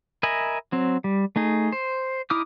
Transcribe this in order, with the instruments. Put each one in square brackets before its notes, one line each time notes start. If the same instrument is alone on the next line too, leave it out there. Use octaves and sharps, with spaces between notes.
[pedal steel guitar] A#4 D#5 E5 G#5 B5
F#3 C4
G3
A3 D#4 G#4
C5
D#4 E4 D6 D#6 F6